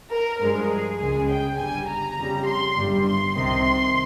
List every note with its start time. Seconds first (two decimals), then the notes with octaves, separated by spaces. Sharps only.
0.12 A#4
0.41 G2 F3 G#3 A#4
0.71 G#4
1.00 C#2 C#3 G#3 G#4
1.29 G5
1.58 G1 G2 G3 G#5
1.89 A#5
2.18 F2 C#3 G3
2.47 C6
2.76 G1 G2 G3
3.06 C6
3.35 C2 C3 D#3 C6